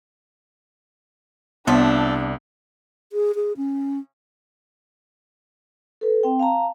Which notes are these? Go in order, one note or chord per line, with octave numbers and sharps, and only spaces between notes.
C2 F3 A3 B3 D4 C#5
G#4
G#4
C#4
A4 B4
C4 G5
F5 A5 A#5